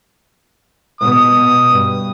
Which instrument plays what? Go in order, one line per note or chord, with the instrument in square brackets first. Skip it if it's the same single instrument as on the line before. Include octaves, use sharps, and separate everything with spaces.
[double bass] B2 [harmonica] D#6
[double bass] G2